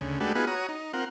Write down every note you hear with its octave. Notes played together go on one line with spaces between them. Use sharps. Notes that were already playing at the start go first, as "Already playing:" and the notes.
D2 C#3
G#3 A3 D4 F#4 G4 B4
B3 D#4 F4 F#4 G#4 B4
F#4 C#5 A#5 D#6
D#4
C4 F4 A#4 F#5